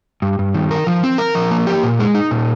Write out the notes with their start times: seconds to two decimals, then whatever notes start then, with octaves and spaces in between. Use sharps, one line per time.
0.22 G2
0.39 G2
0.54 D#3
0.71 A#4
0.87 F3
1.03 C4
1.18 A#4
1.35 F3
1.51 A#3
1.67 G4
1.83 A#2
1.99 G#3
2.15 D#4
2.31 A#2